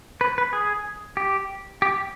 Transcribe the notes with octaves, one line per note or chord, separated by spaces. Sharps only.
B4
B4
G#4
G4
G4